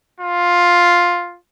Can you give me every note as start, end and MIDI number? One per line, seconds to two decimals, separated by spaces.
0.20 1.37 65